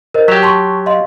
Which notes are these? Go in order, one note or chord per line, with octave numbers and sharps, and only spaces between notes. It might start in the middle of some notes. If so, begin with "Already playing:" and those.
A#4 C5 D#5
F#3 G4 B6 E7 F7
A5 C6 C#6
D#5 F5 C6